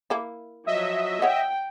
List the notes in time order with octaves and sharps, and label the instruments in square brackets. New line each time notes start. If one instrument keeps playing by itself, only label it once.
[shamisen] A#3 E4
[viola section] F3 F#3 [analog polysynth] D#5 E5
[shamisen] C#5 F#5 [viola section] G5